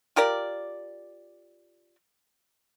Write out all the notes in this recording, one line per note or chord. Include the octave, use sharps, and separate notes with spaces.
F4 G4 A#4 D5